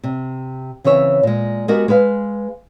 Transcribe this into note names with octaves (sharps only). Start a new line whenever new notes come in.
C3
C#3 E3 C4 C#5 E5
A#2 G#3
G#3 B3 F#4 G4 A#4 D#5
G#3 G#4 B4 F5